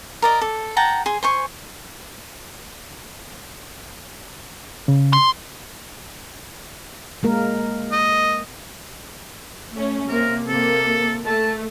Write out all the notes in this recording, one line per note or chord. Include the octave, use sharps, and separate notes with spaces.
A#4 D5 D#5
A4
F#5 G5 A5 A#5
G#4 C6
C5 G#5 C#6
C#3
C6
G#3 A#3 A#4
D#5
A3 C#4
C3 A#3 A#4
C3 A#3 A4
A3 A5